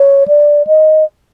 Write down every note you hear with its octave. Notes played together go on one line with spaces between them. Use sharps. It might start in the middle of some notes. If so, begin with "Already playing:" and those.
Already playing: C#5
D5
D#5